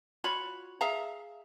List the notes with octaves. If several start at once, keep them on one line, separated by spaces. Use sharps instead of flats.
F4 F#4 C#5 B5
G#4 E5 F5 A#5